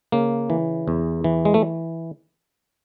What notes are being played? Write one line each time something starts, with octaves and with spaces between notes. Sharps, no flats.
C#3 A#3
E3
E2
E3
G#3
A3